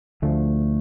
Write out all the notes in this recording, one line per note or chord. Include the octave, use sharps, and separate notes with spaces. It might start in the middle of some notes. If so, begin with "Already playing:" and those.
D2 D3 F3 A3